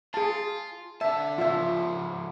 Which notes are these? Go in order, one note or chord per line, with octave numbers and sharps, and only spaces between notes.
F4 G#4 A5
D3 E5 A5
C#3 F3 F4 E5